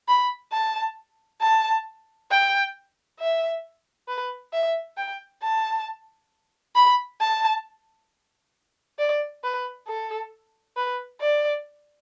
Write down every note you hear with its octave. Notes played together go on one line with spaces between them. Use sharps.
B5
A5
A5
G5
E5
B4
E5
G5
A5
B5
A5
D5
B4
A4
B4
D5